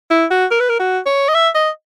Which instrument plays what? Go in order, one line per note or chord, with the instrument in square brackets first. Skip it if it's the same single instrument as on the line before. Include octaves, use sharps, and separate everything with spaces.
[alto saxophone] E4
F#4
A#4
B4
A#4
F#4
C#5
D#5
E5
D#5